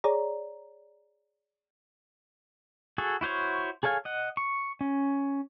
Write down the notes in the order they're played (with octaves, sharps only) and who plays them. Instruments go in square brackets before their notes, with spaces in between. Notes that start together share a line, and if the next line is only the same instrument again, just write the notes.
[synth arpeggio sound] G#4 C#5 D5 A#5
[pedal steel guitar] F#4 G#4 A4
E4 F#4 C5 C#5
G#4 A4 C#5 F5 G#5
D#5 F#5
C#6
C#4